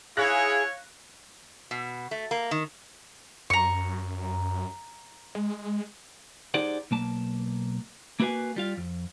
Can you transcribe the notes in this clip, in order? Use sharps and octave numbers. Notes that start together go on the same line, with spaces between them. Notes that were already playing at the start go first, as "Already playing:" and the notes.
E4 G#4 C#5 F5 F#6 A#6
B2
A3
A#3
D#3
F#2 A#5 C#6
G#3
D#4 G4 G#4 C5 D5 F#5
B1 A#3 A5
A#3 E4 F#4 B4 F5 G#5
G3 F4 F5
F2